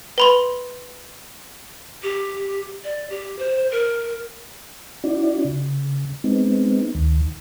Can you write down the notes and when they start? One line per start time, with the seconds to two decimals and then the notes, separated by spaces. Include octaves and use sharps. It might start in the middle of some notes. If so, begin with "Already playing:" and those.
0.18 B4 B5 C6
2.03 G4
2.84 D5
3.10 G4
3.39 C5
3.71 A#4
5.04 C#4 D#4 E4 F#4 D5
5.45 C#3
6.24 G#3 B3 C4 D#4
6.95 D2 D#3